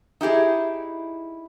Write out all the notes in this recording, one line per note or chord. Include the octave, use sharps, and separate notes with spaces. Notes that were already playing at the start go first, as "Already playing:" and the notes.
D#4 E4 G4 G#4